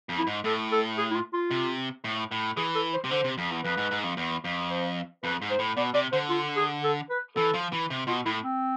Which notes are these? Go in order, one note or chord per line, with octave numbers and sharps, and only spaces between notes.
F2
E4
G#2
A2 A4
A4
G#4
E4
F4
F4
C3
A2
A2
E3 G#4
A4
C5
C3
D3 C5
C3
F2
E2
F2 B4
G#2
G#2
F2
E2
F2
C5
F2 B4
G#2
C5
A2
B2 D5
C3 D5
D3 C5
F4
G#4
A4
B4
E3 A4
F3
E3
C3
B2 F4
A2 E4
C4